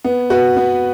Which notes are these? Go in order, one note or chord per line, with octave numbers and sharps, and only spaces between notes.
B3
F#4 B4
B3